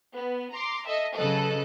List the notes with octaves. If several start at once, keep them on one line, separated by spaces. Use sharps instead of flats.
B3
A#5 C6 D6
A4 D#5 E5
C#3 F#3 A4 B4 D#5 F#6